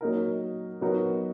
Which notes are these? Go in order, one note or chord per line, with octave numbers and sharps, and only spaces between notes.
F#3 A#3 D#4 A#4
F#3 B3 D#4 F#4 A#4